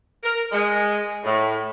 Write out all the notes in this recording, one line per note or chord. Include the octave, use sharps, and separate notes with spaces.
A#4
G#3
A2